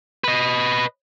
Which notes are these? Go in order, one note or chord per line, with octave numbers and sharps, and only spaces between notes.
B4 D#5